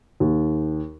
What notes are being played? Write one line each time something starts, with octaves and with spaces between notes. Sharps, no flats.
D#2